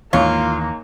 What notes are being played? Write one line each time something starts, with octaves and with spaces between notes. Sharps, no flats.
D#2 G#2 E3 A#3 F4 C#5